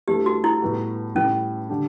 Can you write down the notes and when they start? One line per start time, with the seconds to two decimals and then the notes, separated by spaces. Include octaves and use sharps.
0.08 G2 E3 A3 G4
0.26 F#4
0.44 E4
0.62 A2 G3 B3 F#4
1.15 A2 E3 G3 C#4
1.69 D3 G3 D4 G4